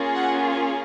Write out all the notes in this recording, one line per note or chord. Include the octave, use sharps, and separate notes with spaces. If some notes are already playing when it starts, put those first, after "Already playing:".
Already playing: A#3 C#4 F4 G#4
F#5